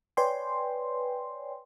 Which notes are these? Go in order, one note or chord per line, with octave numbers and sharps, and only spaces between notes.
B4 C#5 D5 G5 G#5 C6